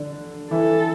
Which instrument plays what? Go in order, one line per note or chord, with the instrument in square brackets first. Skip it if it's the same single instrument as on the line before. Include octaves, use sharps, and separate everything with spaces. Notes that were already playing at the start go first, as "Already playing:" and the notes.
Already playing: [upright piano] D3 D4
[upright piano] E3 E4 [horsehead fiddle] A4